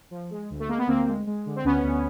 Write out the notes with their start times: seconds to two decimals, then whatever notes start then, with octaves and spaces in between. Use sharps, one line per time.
0.11 F3
0.30 G#3
0.50 D2
0.60 A3
0.69 G#3 A#3
0.78 B3
0.87 D2 A#3 C4
1.07 G#3
1.27 G#3
1.46 D3
1.56 C4
1.64 D2 B3 C#4
1.83 D2